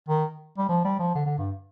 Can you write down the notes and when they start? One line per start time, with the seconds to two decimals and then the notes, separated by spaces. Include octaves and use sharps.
0.08 D#3
0.58 G3
0.69 F3
0.85 G3
1.00 F3
1.15 D3
1.26 D3
1.38 G2